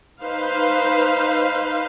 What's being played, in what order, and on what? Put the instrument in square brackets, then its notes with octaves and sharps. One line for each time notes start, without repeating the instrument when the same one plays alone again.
[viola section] D#4 B4 C5 F5